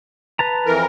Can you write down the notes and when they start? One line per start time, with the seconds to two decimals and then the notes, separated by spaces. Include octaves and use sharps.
0.39 B4 A5 A#5
0.66 F2 E3 A#4